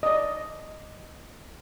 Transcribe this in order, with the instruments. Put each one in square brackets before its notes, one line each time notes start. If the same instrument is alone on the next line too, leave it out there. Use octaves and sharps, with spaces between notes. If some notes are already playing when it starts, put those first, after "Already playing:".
[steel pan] D5 D#5